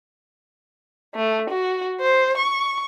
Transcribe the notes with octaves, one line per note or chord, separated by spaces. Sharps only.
A3
F#4
C5
C#6